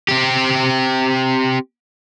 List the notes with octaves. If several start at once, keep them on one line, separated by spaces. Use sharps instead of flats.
C4 G4